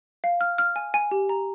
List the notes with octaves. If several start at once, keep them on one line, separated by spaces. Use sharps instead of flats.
F5
F6
F6
G#5
G#5
G4
A#5